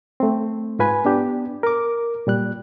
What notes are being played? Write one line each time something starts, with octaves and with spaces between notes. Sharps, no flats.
A3 C4
G#2 F4 B4 G#5 B5
B3 D4 G4
A#4 D6
A#2 G3 F#6